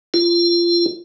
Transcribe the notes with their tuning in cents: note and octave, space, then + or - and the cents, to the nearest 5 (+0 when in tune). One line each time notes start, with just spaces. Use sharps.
F4 -20